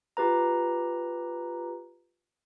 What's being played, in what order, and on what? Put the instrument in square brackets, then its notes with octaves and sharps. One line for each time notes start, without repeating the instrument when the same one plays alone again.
[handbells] F4 G4 B4 A#5